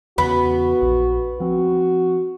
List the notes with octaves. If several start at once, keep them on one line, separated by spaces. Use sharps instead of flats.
E2 C#3 B3 F#4 B5
A#1
F3 C4 F#4